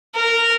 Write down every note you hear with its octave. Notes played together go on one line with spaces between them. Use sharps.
A#4